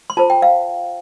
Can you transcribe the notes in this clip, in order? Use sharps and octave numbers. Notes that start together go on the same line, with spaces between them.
C6
F4 A4 C5 A5
G5
F5